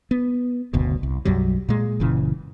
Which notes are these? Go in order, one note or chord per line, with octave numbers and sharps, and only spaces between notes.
B3
F#1 D2 B2
C2
B1 F#2 F#3 G3
A#2 G#3
F#1 A#2 C#3 E3